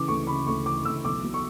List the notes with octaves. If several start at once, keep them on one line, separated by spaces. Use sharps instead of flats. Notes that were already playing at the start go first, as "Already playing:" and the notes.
Already playing: C#3 E3 D6
D2 C#6
C#3 B5
D2 C#6
E3 D6
D2 E6
B1 D6
B2
C#6